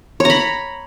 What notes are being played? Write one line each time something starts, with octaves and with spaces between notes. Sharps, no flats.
C#5 A#5 B5